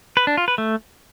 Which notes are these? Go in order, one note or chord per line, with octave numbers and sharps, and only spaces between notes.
B4
D4
F4
B4
A3